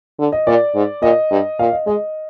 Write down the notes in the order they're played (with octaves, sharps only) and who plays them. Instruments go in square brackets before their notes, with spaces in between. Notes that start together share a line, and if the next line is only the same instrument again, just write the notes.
[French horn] D3
[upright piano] D#5
[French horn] A#2 [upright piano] D5
[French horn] G#2
[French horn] A#2 [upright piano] D#5
[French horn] G2
[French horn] A#2 [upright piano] F5
[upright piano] D#5
[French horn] G#3 [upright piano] D#5